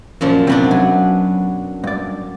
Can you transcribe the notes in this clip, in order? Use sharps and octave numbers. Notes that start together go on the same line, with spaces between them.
F#2 A#2 F3
C3 F#3 B3 D4
B1 F#2 G#5
G2 D5